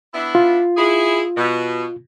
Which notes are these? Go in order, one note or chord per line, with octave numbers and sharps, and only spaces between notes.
B3 D4 E4
F4
E4 G#4
B2